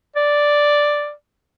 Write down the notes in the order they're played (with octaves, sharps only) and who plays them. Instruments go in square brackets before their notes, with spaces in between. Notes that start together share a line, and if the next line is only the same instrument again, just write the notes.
[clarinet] D5